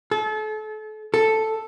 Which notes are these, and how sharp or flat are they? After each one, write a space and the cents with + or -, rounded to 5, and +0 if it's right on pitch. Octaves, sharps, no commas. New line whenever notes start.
A4 -35
A4 +0